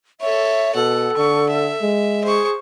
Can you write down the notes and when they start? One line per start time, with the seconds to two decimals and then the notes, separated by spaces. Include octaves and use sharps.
0.21 A4 C#5 E5
0.75 B2 A4 F#5
1.18 D3 C#6
1.49 E5
1.82 G#3
2.24 G#4 C5 C#6